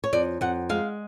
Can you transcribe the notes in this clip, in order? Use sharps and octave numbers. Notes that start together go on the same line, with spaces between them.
C#5
F2 D5
F2 F#5
G#3 F5